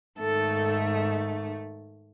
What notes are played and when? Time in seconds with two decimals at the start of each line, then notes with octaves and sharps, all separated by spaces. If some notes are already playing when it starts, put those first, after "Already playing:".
0.19 G#2 D#3 A3 A4